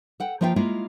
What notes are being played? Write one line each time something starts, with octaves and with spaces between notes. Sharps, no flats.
A4 F#5 G5
F3 A#3 F4 E5 F#5 G5
G#3 A#3 E4 F4